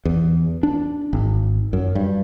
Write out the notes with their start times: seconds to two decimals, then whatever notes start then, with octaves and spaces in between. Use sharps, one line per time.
0.05 E2
0.63 D4
1.13 G#1
1.73 F#2
1.95 G2